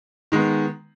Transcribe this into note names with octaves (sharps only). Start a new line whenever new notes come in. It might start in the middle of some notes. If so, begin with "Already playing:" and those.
D#3 G#3 B3